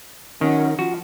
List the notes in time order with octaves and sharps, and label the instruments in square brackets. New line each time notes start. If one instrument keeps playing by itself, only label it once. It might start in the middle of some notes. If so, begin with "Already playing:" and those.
[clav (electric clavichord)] D#3 [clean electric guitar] C#4 F#4
[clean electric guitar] F3 [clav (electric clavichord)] F#4